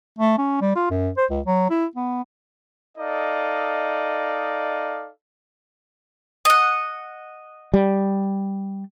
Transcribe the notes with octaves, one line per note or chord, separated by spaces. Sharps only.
A3
C#4
G3
F4
F#2
C5
C#2
F#3
E4
B3
D#4 A4 D5 D#5 F5
D#5 F#5
G3